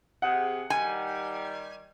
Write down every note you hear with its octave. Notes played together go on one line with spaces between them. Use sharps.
C3 G#4 F#5
D#3 G3 G#5